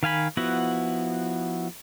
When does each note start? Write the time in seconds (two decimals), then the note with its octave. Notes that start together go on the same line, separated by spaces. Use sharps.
0.03 D#3 F5 G#5 B5
0.37 F3 B3 E4 F#4 F#5